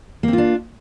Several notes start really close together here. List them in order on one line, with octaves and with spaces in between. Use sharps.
A#3 C4 F4 D4